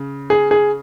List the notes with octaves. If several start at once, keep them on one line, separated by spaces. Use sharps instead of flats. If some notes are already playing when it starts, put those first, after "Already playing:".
Already playing: C#3
G#4
G#4